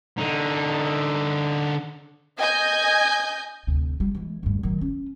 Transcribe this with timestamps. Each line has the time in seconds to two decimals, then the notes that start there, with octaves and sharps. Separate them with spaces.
0.18 D3 D#4
2.39 D#5 G#5 G6
3.67 D2 C3
4.00 G3
4.15 E3 G#3
4.43 D2 G2
4.63 D#3 F#3
4.81 C#4